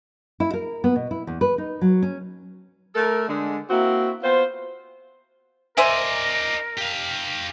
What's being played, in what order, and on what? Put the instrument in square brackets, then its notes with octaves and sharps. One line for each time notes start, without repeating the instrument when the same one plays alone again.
[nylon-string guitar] E4
A#4
B3
B2
E4
E2
B4
D#4
F#3
C#4
[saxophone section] A3 A4 A#4
D3 G#3
A#3 C4 E4 F#4
B3 F4 C5
[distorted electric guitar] D#4 D5 [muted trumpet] A#4 [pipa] C5 E5 G#5
[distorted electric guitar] G4 F5